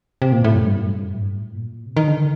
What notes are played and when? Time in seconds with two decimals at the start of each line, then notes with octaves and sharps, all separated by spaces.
0.22 C3
0.32 A#2
0.44 A2
0.55 F#2
0.65 G2
0.76 F#2
0.87 G2
1.04 F#2
1.16 A2
1.21 G2
1.37 A2
1.54 A#2
1.86 C3
1.97 D#3
2.08 D3
2.18 D#3